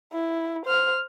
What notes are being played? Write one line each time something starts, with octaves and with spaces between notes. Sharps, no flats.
E4
C5 F6